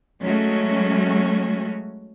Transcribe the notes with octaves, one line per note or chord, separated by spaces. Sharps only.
F#3 G#3 A3 C#4 F#4